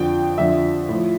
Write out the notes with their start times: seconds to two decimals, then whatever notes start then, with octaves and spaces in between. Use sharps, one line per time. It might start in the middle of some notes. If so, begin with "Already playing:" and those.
Already playing: F2 D3 F3 G5
0.38 F2 D3 F3 E5
0.89 A2 F3